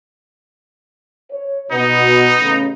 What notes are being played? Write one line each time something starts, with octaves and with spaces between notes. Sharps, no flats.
C#5
B2 B3 D#4
A1 C#3